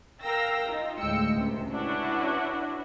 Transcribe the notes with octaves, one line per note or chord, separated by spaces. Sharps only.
A#4 F5 G5 E6 A#6
D#4 F4
D2 A2 G#3 G5 E6 C#7
C#2 C3
C#4 D4 E4 F#4 B4